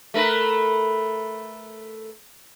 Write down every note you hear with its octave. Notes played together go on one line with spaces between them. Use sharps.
A3 A#4 B4